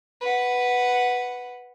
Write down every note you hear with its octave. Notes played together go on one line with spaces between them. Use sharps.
B4 F#5